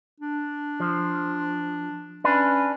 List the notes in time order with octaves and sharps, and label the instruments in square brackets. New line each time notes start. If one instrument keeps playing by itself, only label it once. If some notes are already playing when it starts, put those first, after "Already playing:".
[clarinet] D4
[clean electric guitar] F3
[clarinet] C#4 [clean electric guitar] D4 B4